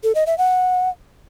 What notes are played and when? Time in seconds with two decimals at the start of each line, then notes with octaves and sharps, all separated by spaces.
0.03 A4
0.15 D#5
0.27 E5
0.38 F#5